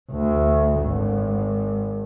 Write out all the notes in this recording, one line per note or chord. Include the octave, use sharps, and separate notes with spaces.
D2
G#1